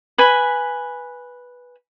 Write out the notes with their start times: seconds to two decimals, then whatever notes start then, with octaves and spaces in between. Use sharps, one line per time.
0.18 B4 G#5 B5